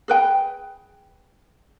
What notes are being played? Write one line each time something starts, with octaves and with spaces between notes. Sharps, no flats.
G#4 B4 G5